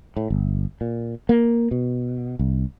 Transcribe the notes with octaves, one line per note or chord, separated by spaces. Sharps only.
A2
G1
A#2
A#3
B2
C2